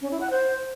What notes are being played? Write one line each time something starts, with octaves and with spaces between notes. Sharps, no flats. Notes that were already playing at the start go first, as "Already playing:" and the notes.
C#4
E4
F#5
C5